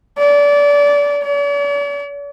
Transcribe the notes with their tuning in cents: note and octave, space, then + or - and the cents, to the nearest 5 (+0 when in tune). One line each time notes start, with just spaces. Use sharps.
D5 -25
D5 -45